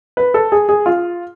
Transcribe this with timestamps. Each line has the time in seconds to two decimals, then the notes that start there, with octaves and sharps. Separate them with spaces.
0.17 B4
0.34 A4
0.52 G#4
0.69 G#4
0.86 F4